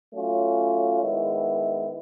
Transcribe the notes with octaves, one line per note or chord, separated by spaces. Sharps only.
F#3 A3 C#4 F4
D#3 G#3 B3 E4